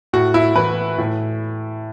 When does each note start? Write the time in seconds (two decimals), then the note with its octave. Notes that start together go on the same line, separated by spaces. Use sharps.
0.13 A2 F#4
0.34 E4
0.56 E3 B4
0.98 A2